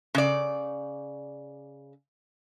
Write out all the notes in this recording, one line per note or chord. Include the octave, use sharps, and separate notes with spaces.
C#3 D5